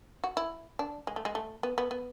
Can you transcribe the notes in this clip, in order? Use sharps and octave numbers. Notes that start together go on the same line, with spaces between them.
F#4
E4
D4
G#3
A3
G#3
A3
B3
B3
B3